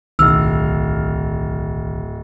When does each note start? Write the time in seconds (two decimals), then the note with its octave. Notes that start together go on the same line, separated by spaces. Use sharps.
0.19 D1 B1 D#3 E6 F6